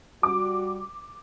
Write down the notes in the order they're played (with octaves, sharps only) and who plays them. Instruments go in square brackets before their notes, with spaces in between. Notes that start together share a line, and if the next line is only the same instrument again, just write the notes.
[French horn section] G3 F#4 [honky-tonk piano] D6